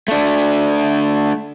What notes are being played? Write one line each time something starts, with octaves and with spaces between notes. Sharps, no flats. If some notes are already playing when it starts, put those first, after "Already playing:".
A3 D4